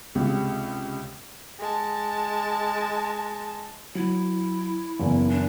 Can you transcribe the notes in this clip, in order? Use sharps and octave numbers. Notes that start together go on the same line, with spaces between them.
C#2 C3
G#3 A5
F#3 E4
F#1 E2
D4